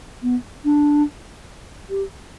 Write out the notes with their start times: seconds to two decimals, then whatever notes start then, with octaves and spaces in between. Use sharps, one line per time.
0.23 B3
0.65 D4
1.90 G4